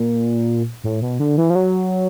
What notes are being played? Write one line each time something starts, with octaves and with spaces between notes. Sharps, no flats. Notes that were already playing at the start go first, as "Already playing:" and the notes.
Already playing: A#2
A2
B2
D3
E3
F3
F#3